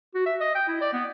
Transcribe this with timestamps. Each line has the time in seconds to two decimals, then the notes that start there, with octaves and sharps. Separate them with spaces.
0.15 F#4
0.26 E5
0.41 D#5
0.55 G5
0.68 E4
0.81 D5
0.93 B3